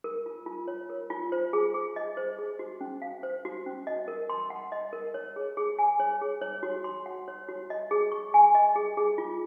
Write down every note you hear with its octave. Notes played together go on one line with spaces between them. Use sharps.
A#4
F4
F4
C#5
A#4
F4
C5
G#4
G#4
D#5
C5
G#4
F#4
C#4
F5
C5
F#4
C#4
D#5
A#4
C6
F#5
D#5
A#4
C#5
G#4
G#4
G#5
C#5
G#4
C#5
F#4
C6
F#5
C#5
F#4
D#5
G#4
C#6
G#5
D#5
G#4
G#4
F4